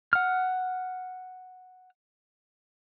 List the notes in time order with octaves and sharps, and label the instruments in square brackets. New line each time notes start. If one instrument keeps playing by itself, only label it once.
[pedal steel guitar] F#5 F6